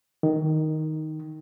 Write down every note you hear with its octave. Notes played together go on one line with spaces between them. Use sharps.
D#3